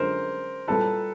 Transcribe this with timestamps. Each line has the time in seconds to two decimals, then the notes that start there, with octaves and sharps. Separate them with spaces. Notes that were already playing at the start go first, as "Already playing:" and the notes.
Already playing: F#2 D3 F3 G#3 B3 A#4 C5
0.68 A#2 G3 B3 E4 A4 B4